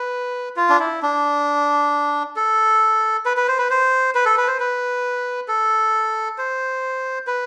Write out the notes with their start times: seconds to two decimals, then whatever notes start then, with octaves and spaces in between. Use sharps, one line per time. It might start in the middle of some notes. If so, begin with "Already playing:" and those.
Already playing: B4
0.57 F4
0.69 D4
0.80 E4
1.02 D4
2.36 A4
3.26 B4
3.37 B4
3.48 C5
3.58 B4
3.70 C5
4.15 B4
4.26 A4
4.38 B4
4.48 C5
4.60 B4
5.48 A4
6.38 C5
7.27 B4